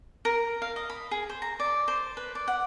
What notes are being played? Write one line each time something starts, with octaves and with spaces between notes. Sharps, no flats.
A#4
F5
D#5
B5
G#4
C5
A#5
D5
C5
B4
D5
F#5